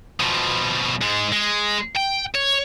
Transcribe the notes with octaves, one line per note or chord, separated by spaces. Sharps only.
B2 F3
G#2 G#3
G#3
G5
C#5